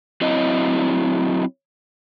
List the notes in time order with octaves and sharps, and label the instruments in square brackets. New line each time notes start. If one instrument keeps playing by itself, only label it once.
[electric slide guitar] F#3 C4 E4 D#5